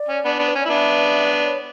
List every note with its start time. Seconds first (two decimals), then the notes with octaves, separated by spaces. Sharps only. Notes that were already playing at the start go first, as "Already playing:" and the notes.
Already playing: D5
0.08 C#4
0.25 B3 D4
0.39 B3 D4
0.48 B4
0.55 C#4 C#5
0.62 D5
0.65 E4
0.69 B3 D4 E5
1.31 D5
1.46 C#5